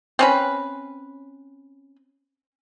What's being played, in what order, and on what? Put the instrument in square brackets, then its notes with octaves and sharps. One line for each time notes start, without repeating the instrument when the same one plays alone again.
[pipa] C4 C#4 B4